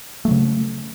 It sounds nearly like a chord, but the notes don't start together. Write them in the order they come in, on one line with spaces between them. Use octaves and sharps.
A3 F#3 C#3